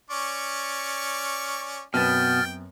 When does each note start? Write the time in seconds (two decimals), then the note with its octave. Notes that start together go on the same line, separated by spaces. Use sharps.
0.10 C#4 D5 C#6
1.94 F#2 B2 B3 C4 G5 F6 A6